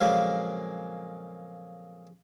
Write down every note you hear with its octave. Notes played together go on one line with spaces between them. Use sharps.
F2 A#2 C#3 F#3 G#3 A#3